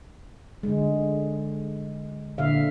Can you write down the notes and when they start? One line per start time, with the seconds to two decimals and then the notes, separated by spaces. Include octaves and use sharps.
0.63 D3 G#3
2.38 A#2 D3 E5 F5